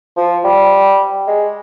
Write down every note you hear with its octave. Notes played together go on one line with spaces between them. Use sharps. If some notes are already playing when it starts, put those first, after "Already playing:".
F3
G3
G#3